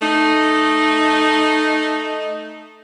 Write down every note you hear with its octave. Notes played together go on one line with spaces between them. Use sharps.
A3 D#4